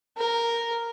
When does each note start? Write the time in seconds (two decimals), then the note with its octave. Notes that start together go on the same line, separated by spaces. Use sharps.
0.18 A#4